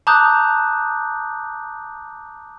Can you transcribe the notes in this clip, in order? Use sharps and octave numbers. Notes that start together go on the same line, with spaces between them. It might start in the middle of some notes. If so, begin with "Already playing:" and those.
A5 A#5 D6 D#6 F#6 G6